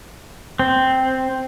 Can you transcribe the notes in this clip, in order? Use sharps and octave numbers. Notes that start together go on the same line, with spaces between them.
C4